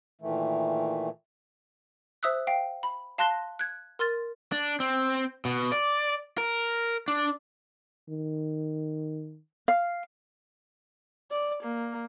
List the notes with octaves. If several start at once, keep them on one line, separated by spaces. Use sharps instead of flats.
A#2 D#3 E3 A3
C5 E5 D#6 E6 F#6
F5 G5
B5
F5 A5 C6 F#6 A#6 G7
F#6 G#6
A#4 C6 F6 A6
D4
C4
B2
D5
A#4
D4
D#3
F5
D5
A#3